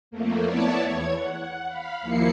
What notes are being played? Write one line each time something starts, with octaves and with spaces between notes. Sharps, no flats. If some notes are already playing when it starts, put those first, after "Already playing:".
F2 A3 A#3
B3 E4 C#5 D5 A5
E2 C#5 G#6
F#5
F5 B5
D#2 F3 A#3 E4 C7 C#7